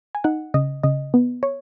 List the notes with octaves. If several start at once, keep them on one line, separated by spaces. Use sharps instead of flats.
G#5
D#4 F#5
C#3 D#5
C#3 D#5
B3
C#5